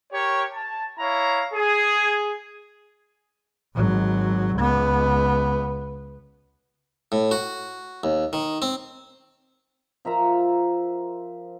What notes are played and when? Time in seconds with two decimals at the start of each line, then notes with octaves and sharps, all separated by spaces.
0.13 G4 A#4 C#5
0.53 A5
0.99 E4 C#5 F5 A#5
1.53 G#4
3.75 G#1 F#3
4.56 C#2 B3
7.12 A2
7.31 F#4
8.04 D#2
8.33 D#3
8.62 C4
10.05 F3 A#4 E5 A#5